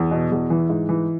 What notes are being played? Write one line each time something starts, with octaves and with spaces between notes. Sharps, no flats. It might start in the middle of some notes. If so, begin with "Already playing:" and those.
Already playing: E2
B2
E2
E3
G#2
E3